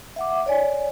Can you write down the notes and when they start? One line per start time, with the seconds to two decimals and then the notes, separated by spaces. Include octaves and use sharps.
0.16 E5 F#5 D6
0.46 C#5 D5 G#5